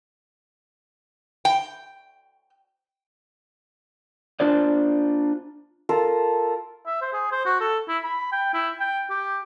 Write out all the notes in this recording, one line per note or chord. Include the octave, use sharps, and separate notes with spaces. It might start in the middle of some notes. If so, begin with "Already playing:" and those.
G5
D4 F4 C5 D5
F4 A4 A#4
E5
C5
G#4
C5
F#4
A4
E4
B5
G5
E4
G5
G4